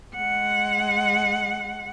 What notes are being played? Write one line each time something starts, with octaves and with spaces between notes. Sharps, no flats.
G#3 F#5